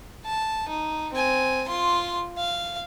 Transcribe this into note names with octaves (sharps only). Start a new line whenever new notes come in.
A5
D#4
C4 G#5
F4 C6
F5